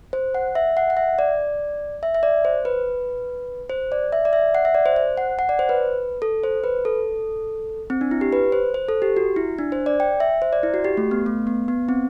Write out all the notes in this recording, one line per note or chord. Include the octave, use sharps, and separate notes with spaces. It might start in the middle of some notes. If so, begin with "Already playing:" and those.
C5
F#5
E5
F#5
F#5
E5
D5
E5
E5
D5
C5
B4
C5
D5
E5
D5
E5
F#5
E5
D5
C5
C5
F#5
F#5
D5
C5
B4
A4
C5
B4
A4
C4
D4
E4
G4
B4
C5
C5
A4
G4
F#4
E4
D4
C5
D5
G5
E5
C5
D5
E4
F#4
G4
A3
B3
A3
B3
B3
C4